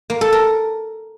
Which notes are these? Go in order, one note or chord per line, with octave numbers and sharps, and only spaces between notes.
A#3
A4
A#4